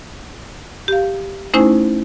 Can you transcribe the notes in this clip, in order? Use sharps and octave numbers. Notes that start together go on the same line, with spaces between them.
G4 F5
A3 C#4 D#4 E4 C5 G#5